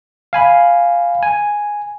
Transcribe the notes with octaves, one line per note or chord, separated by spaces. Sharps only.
F5 G#5 B5
G#5